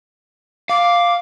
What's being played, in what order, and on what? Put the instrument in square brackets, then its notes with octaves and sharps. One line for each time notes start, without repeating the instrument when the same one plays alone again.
[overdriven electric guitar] F5 [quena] D6